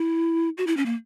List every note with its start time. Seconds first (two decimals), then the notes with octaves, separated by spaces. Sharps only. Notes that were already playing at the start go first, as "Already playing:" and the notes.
Already playing: E4
0.58 F#4
0.67 E4
0.77 C#4
0.86 A#3